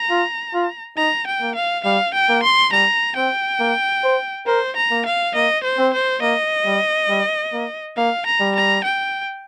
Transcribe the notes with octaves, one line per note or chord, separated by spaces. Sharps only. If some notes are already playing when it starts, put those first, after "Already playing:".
Already playing: A#5
F4
F4
D#4 A#5
G5
A#3
F5
G3 F5
G5
A#3
C6
G3 A#5
C4 G5
A#3
C5
A#4 C5
A#5
A#3
F5
A#3 D#5
C5
C4
C5
A#3 D#5
G3
G3
A#3
A#3 F5
A#5
G3
A#5
G5